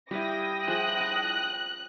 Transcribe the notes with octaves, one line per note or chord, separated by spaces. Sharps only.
G3 E4 G4 B4 F5 G5 D#6 A#6
F3 G#4 C5 F#6
F5